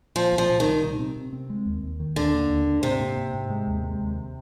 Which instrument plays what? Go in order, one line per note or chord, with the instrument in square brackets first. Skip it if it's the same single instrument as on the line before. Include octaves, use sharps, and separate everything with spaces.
[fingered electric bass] A#2 [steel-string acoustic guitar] F3
[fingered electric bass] C2
[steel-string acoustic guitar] F3
[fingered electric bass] A#2
[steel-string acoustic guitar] D#3
[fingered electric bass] G3
C3
C4
C3
C4
G#3
D#2
D#2
D#3
[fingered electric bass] D#2 [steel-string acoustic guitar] D3
[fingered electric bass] A#3
D#2
D4
[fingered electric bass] G#2 [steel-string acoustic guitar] C3
[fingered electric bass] A#3
G#2
G#2
G#3
D#2
G#3
D#2